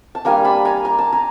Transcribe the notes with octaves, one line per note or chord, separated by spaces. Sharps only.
A5
G3 A#3 D4 G#5 A#5
A5 B5
G#5 A#5
A#5
A5
G#5 A#5